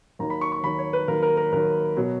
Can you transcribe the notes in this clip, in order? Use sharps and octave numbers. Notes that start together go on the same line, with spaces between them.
D#2 D#3 F#3 A#5
B5
C#6
C#6
D#2 D#3 F#3 B5
C#5
B4
D#2 D#3 F#3 A#4
A#4
A#4
D#2 D#3 F#3 A#4
B2 F#3